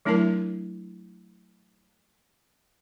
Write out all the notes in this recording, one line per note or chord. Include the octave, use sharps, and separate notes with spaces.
F#3 A3 D4 E4 A#4 A5